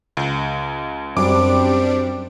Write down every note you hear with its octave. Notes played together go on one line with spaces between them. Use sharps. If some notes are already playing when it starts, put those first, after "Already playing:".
C#2
F#2 G3 C4 D4 D6 D7